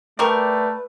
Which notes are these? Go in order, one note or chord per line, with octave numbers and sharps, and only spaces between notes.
G3 A3 A#4 B4 D5 G5 C#6